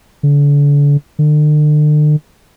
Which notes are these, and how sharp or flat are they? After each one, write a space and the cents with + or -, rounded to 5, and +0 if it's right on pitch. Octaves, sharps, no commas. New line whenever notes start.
D3 -35
D3 +40